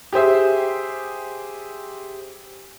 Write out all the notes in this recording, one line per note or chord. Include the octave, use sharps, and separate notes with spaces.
G4 G#4 C5 E5